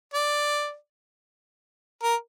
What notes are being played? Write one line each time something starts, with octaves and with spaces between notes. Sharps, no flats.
D5
A#4